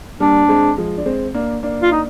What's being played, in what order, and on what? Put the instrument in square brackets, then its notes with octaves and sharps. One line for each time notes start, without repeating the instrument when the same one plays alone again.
[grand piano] G3 A#3 [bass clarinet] D4
[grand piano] G#3 C4
F3 G#3
D4
G#3 C4
A#3 D4
A#3 D4
[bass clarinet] F4
D#4